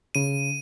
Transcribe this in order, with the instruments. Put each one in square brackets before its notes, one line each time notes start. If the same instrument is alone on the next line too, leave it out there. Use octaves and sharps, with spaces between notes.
[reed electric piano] C#3 [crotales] D#7